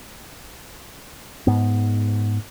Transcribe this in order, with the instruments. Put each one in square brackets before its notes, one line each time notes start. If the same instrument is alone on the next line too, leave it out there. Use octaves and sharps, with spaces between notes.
[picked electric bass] G#2 B3